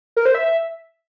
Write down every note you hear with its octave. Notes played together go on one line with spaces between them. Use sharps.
A#4
C5
E5